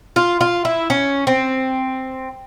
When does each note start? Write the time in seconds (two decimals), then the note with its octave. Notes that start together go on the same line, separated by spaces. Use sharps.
0.16 F4
0.41 F4
0.65 E4
0.90 C#4
1.27 C4